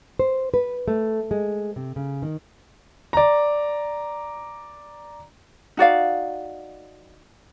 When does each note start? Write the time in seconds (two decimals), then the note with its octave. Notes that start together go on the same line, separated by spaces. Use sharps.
0.19 C5
0.54 B4
0.88 A3
1.31 G#3
1.76 C3
1.96 C#3
2.23 D#3
3.13 D5 A#5
5.77 D#4 F#4 D5 F5